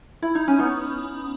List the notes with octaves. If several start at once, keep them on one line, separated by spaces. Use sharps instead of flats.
E4
D#4
C#4
B3 D#4